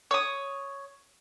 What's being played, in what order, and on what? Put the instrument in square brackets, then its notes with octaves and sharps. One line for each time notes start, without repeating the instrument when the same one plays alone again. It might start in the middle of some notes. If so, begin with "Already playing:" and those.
[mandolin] C#5 D#6